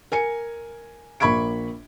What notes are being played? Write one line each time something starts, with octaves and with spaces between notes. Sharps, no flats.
A#4 G#5 C#7
A#1 A#3 B5 C#6 G#6 D7